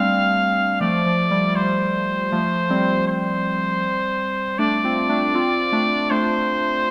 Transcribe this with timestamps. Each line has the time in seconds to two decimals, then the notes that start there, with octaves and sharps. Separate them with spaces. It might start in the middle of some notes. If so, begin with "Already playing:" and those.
Already playing: G3 A3 C4 D4 F5
0.81 F3 A3 D5
1.06 F3
1.31 G3
1.56 G3 C5
2.32 F3 A3
2.70 G3 C4
3.08 C5
4.59 A3 D4 D5
4.84 C4 F4
5.09 A3 D4
5.34 C4 F4
5.72 A3 D4
6.10 A3 D4 C5